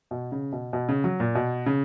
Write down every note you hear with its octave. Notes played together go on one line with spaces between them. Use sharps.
B2
C#3
B2
B2
C#3
F#3
A#2
B2
C#3